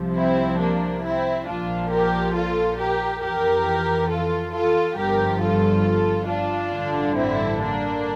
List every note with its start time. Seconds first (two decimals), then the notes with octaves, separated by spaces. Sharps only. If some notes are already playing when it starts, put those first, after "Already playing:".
Already playing: C2 C3 F3
0.16 C4 E4
0.60 A#3 D4
1.03 C4 E4
1.47 A#1 A#2 F3 D4 F4
1.90 G4 A#4
2.35 F4 A4
2.78 G4 A#4
3.22 F2 E3 G4 A#4
4.09 F4 A4
4.53 F4 A4
4.97 G1 G2 F3 G4 A#4
5.41 F4 A4
6.28 D4 F4
6.72 A1 G2 D3
7.16 C4 E4
7.59 A#3 D4